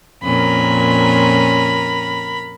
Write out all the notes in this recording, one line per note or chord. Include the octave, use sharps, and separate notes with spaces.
F2 A#2 C#4 A#4 B5